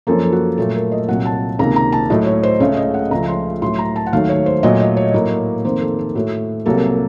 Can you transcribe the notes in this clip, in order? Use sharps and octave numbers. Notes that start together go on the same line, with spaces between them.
F#2 F3 A#3 A4
A4
F#4
A#2 F#3 A3 A4
A#4
D#5
C2 A#2 F#3 F#5
A5
C#2 C3 D#3 A#3 A#5
A#5
A5
A2 F#3 A3 D#5
C#5
C5
C#2 C#3 A3 C#5
D#5
F#5
C#2 C#3 F3 A3 A#5
C6
A2 F#3 A3 C6
A#5
A5
F#5
D#2 D#3 F#3 A3 F5
C#5
C5
A#2 F#3 A3 D#5
D#5
C#5
A2 F#3 A#3
F2 D#3 A#3 C5
A4
A4
A2 A3 F#4
C2 C3 F#3 A#3 A4